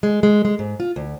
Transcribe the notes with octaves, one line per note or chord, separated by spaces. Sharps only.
G#3
G#3
G#3
G#2
F4
D2